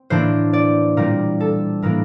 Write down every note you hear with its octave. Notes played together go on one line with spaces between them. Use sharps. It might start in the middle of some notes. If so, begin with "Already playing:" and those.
Already playing: C4
A2 E3 A#3 D4 C5
D5
A#2 G3 C4 A#4
A4
A2 E3 A#3 D4 A#4